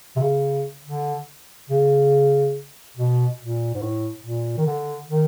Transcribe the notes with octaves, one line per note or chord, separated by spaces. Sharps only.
C3
C#3
D3
C#3
B2
A#2
G#2
A2
A#2
D#3
D3
D#3